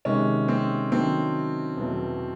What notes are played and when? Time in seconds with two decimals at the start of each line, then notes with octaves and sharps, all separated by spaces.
0.05 C3 D#3 G#3 C#4
0.48 C4
0.92 D#3 F#3 A3 C4 D4
1.77 E2 B2 F#3 A3